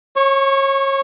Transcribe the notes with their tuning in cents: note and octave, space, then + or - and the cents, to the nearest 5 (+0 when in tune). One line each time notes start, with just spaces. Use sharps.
C#5 -30 C#6 +0